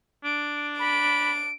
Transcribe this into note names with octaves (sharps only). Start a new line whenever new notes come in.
D4 D7
B5 D7